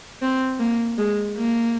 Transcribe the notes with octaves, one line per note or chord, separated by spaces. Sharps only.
C4
A#3
G#3
A#3